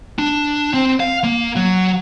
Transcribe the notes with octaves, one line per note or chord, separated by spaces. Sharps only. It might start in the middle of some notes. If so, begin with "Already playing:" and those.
D4
C4
F5
A#3
F#3